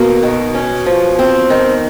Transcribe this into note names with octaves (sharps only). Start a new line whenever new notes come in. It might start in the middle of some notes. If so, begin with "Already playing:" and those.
Already playing: B2 A#3
D#3
C#4
F3
C4
D#3